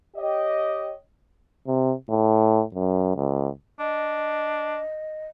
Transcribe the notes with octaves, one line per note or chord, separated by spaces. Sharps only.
G4 C#5 D#5
C3
A2
F#2
C#2
D4 D#5